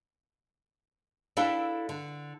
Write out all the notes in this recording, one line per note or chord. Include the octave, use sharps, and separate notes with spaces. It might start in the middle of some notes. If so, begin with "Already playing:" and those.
D4 E4 A4 E5 F5 G5
D3